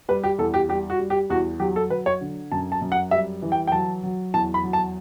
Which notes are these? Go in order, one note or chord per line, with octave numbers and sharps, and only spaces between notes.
G3 B4
G4
E2 A4
G4
G3 G4
F#4
G3
G4
E2 F#4
F#3 G4
A4
F#3 B4
C#5
D3
F#2 A5
A5
F#2
F#5
G3 E5
E3
G5
G5
F#3 A5
F#3
E2 A5
B5
F#3
A5